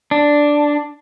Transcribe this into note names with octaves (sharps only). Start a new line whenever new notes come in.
D4